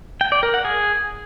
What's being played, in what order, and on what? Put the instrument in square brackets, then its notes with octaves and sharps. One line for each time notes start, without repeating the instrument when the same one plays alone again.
[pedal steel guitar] G5
D5
A#4
F#5
G#4